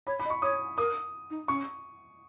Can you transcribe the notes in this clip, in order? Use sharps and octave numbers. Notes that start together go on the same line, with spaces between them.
C#5 B5
B5
D#5
C#6
C#5 D#6
A#4 D#6
D#4
C#4 C#6